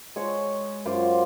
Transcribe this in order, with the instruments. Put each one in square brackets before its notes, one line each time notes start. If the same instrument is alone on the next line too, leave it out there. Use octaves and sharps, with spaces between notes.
[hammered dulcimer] G#3 C#5 C#6
F#2 F4 C5 D6